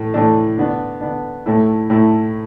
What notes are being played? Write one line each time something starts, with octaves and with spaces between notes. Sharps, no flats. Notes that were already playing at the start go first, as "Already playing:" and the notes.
Already playing: A2 E3 A3
A2 E3 A3 D4
D3 B3 D4
D3 B3 D4
A2 A3 E4
A2 A3 E4